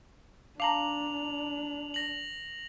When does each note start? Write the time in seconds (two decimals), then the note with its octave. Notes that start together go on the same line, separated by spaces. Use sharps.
0.60 D4 F5 A5 A#5 D6 F7 F#7
1.94 A#6 F#7